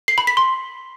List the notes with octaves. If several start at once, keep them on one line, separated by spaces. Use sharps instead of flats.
C7
B5
B6
C6